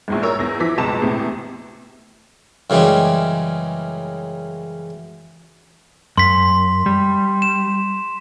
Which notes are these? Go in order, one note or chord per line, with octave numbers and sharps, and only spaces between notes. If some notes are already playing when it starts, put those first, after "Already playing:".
A#1 E2 G#2
A#4 C#5 D5 A#5 C#6 E6
E2 A#6
E3 F3 D6 B6
F#1 C#2 B2 A5 A#5 E7
E2 A2 C3 E3
F#2 C#3 E3 G3 G#3
F#2 C6 B6
G3
E7